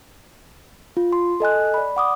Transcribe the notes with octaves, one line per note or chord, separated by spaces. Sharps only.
F4
C6
A4 D#5 G#5 F#6
D5 B5
F#5 D6 D#6